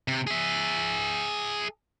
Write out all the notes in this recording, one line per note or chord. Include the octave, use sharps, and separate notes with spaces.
C3
G#4 E5